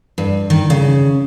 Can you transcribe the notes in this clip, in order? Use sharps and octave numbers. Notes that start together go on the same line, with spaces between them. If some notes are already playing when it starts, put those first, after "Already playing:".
G2
D#3
C#3